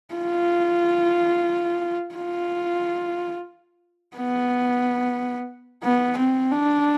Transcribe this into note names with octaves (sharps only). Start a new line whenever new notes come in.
F4
F4
B3
B3
C4
D4